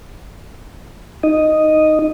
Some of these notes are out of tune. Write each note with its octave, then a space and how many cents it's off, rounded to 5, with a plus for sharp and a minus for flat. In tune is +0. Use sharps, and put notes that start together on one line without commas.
D#4 +0 D#5 -5